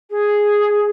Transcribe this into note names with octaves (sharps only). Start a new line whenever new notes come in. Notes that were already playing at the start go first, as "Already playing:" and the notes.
G#4